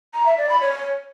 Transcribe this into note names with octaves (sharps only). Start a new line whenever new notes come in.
A#5
E5
D5
B5
C#5